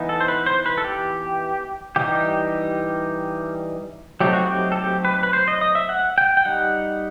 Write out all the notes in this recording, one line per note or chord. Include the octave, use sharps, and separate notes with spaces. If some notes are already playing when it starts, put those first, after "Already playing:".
Already playing: E3 B3 D#4
A4
C5
B4
C5
B4
A4
G4
E3 G3 D#4 G4
F#3 A3 C4 D#4 G4
F#4
G4
A4
G4
B4
B4
C5
D#5
D#5
E5
F#5
G5
G5
G3 D#4 F#5